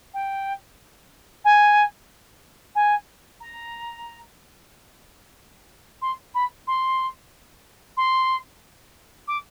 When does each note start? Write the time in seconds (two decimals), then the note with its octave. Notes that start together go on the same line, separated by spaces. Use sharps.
0.14 G5
1.44 G#5
2.75 G#5
3.40 A#5
6.01 C6
6.34 B5
6.67 C6
7.97 C6
9.27 D6